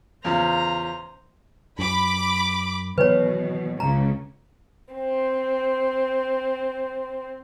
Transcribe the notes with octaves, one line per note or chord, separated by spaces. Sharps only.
E2 C#3 F3 C5 A#5
F#2 B5 D6
B2 D#3 E3 F#3 B4 C#5
C#2 C#3 A#5
C4 C5